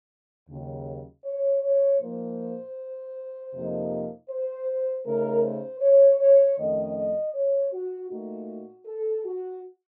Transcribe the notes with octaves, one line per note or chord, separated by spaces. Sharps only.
D#2 C#3 F#3
C#5
C#5
A#2 F3 A#3 D#4 C5
F2 C3 F3 A#3 D#4
C5
C#3 A3 D#4 A#4
C5
C#5
C#5
F2 D#3 A3 C#4 D#5
D#5
C#5
F#4
A#2 A3 D#4 F#4
A4
F#4